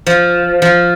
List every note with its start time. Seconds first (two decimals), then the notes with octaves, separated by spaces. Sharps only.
0.06 F3
0.62 F3